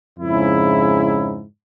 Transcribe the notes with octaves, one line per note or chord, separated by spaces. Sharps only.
F2 G#2 C#3 E4